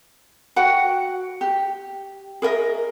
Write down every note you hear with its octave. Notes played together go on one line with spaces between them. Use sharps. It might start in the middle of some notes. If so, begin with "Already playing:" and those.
F#4 F#5 G5
G4
G#4 A#4 D#5 E5